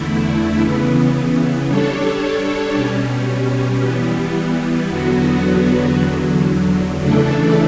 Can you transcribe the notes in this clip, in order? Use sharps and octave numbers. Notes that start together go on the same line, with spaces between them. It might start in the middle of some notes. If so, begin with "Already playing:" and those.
Already playing: E2 D3 A3 E4
C#3 E3 B3
G3 D4 A4 C#5
B2 G3 C#4
E3 G3 B3
E2 D3 F#3 B3 F#4
E2 D3 F#3
C#3 E3 A3 D4 A4